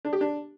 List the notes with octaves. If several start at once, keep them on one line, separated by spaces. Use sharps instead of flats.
D4
G4
D4